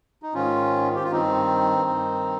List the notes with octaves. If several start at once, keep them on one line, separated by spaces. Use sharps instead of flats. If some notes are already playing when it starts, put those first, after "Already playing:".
D#4
G#2 D#3 C#4 F4
G4
F4
G2 D#3 C4 D#4
G2 D#3